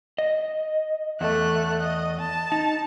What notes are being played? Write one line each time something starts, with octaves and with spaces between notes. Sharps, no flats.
D#5
E2 A3 F#6
D#5
A5
D#4